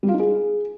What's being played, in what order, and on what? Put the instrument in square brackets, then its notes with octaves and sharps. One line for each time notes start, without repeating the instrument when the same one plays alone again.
[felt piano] G3
F4
D#4
G#4